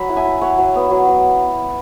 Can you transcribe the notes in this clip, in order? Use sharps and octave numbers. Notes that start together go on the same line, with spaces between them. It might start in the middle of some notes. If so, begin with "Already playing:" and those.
Already playing: F#3 B5
E4 F#5
E5 G#5
E4
F#3 C#5 F#5
F#3
B3
F#3
F#3